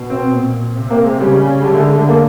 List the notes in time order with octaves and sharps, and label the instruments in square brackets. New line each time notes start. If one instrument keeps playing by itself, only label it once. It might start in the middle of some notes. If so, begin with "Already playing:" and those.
Already playing: [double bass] B2
[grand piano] C4
[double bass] A#2
C3
[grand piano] A#3
G#3
[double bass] C#3 [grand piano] G3
[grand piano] G#3
[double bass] D3 [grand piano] G3
[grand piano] A3
G#3
A3
A#3